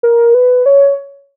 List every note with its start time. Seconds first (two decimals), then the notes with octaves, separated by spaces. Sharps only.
0.03 A#4
0.34 B4
0.66 C#5